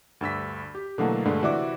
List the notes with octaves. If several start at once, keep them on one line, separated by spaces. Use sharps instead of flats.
D2 G2 E6 B6
G4
B2 D3 E3 F#3 A3 A#3
G2 D3 G#3 A3
C3 E3 F#4 D5 E5 D6